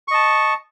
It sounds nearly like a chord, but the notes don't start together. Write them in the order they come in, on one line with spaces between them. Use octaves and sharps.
C#6 D#5 A5